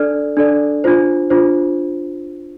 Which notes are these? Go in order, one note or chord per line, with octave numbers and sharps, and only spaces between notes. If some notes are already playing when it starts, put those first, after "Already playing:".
Already playing: D4 A4 D5 F6
D4 A4 D5
D4 F4 C5
D4 F4 C5